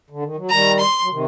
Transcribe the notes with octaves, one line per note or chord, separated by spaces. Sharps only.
D3
D#3
F#3
D#3 G3 A#5
C6
F#3
C3 D#3